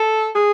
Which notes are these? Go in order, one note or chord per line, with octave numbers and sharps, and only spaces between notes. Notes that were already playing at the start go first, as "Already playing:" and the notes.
Already playing: A4
G#4